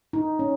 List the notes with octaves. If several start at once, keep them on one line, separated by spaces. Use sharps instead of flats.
D#4
C#4